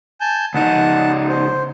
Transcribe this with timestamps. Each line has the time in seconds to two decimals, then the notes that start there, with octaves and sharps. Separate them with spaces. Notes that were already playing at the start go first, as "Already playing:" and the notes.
0.21 G#5 A5 G6
0.54 C#2 D#4 F#5 A5
1.29 C5